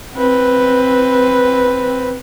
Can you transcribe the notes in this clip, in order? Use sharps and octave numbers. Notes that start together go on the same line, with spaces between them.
C4 B4